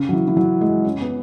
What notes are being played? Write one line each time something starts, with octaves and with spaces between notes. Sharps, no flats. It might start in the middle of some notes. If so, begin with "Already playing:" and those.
Already playing: C#3
F#3
E3
E3
F#3
G#3
C#4
B3